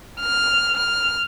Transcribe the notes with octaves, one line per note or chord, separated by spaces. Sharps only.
F6
F6